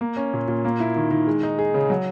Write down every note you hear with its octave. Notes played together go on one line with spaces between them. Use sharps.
A#3
C#4
A#2
A#2
A#3
E4
D#3
D#3
G#3
D#4
G#4
C#3
F#3